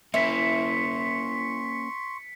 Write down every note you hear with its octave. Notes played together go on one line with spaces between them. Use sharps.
A#3 C#4 E4 C6 C#6 B6 C#7